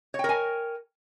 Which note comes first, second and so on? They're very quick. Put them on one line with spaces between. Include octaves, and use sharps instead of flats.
C#5 G5 A#4 G#5